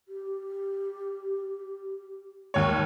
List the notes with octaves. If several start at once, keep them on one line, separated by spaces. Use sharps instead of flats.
G4
D#2 C#5